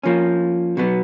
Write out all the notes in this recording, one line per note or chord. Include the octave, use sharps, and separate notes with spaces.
F3 A#3 C#4
B2 F#3 B3